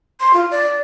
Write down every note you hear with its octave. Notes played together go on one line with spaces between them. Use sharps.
C6
F4
D5